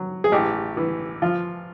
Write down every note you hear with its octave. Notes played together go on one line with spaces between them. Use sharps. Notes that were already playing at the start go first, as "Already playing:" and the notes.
Already playing: F#3
G#4
A1 G4
E3
F3 F4